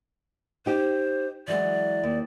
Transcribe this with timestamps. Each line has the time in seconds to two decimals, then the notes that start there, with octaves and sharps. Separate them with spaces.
0.66 D#4 G4 C5
1.48 E3 F#3 G#3 D5
2.04 D#2